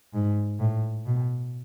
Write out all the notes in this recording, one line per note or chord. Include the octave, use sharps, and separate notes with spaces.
G#2
A2
B2